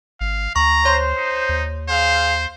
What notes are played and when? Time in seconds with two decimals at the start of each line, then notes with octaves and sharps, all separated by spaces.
0.21 G#1 F5
0.56 D2 A#5 C#6
0.85 C5 C#5 C6
1.18 D#4
1.49 D#2
1.89 G#4 C5 F5